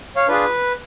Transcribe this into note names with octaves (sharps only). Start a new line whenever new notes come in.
C#5 F5
D4 F4 G#4 B4